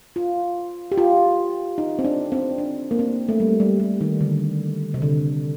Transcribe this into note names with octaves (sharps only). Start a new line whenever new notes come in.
F4
G4
F4
D#4
C4
D4
C4
D4
A#3
C4
A3
G3
G3
G3
D#3
D3
C3
D3